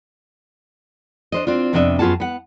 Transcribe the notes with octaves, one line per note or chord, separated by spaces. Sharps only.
D4 C5 D#5
C4 D4 F4
F2 C3 B3 D4 D#5 E5
F#2 B3 F4 G#4 F#5 A5
B3 F#5